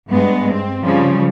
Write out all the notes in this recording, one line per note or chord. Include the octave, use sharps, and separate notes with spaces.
G2 G#3 B3
C4
C#3 F3 G3